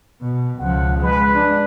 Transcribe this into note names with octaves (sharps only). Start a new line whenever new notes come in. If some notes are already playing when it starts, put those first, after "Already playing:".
B2
C#2 F3 F#5
G#3 B4
D4